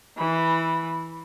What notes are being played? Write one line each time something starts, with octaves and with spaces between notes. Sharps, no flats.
E3 B5